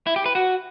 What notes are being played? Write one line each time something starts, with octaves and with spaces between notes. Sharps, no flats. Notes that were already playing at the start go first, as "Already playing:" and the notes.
E4
G4
B4
F#4